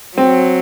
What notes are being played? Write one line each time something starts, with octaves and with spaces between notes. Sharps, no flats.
F#3 C4